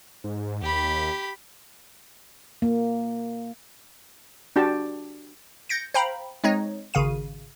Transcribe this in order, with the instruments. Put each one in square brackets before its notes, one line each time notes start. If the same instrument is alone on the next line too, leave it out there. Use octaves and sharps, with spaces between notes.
[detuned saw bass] G#2
[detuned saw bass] D#2 [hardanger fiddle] G4 B5
[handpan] A#3
[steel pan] D4 F#4 G4 A5
[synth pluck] G6 A6 A#6 C#7 D7
C5 F5 G5 A#5 B5
G#3 C4 D#4 C#5 D#5
G#1 C#3 F5 D#7